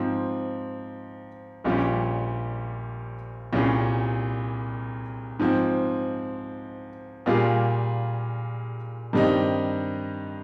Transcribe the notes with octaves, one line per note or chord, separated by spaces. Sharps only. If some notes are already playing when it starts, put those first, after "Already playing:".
Already playing: G#2 F3 C4
A#1 A#2 G3 C#4 G4
C2 A#2 G3 C#4 G#4
G#2 F3 C4
A#2 G3 A#3 F4 G#4
G2 D#3 G3 C4 D#4